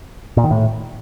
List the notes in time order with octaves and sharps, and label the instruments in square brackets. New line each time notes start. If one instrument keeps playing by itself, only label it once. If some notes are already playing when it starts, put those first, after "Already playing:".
[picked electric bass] A#2
D#3
A2